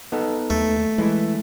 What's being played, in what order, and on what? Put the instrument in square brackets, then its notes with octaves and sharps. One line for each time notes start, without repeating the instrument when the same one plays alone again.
[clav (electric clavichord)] B3 D#4 A4
[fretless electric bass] D#2 [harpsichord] A3
[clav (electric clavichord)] E3 E4 [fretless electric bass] G#3